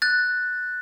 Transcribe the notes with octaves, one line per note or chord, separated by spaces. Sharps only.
F#6 A6